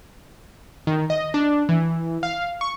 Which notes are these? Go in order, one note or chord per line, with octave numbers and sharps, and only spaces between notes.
D#3
D#5
D4
E3
F5
C#6